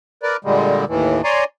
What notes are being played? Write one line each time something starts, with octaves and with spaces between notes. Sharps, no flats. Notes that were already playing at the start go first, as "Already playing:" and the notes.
A#4 B4 D5
A#2 D3 G3 G#3
D#2 A2 E3
C#5 D5 G#5 A#5 C6